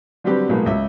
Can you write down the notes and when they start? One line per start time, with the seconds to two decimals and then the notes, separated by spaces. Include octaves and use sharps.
0.24 D3 F#3 G3 C4 G4 B4
0.49 B1 A2 F#3 G#3 A#3 B3
0.66 C#2 E5